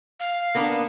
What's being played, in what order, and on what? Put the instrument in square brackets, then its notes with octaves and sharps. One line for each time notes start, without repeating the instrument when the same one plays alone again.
[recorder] F5
[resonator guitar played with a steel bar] A#3 B3 D4